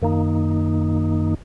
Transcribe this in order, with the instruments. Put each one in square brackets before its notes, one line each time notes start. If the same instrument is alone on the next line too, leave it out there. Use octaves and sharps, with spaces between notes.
[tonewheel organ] F#2 D#3 A#3 D#4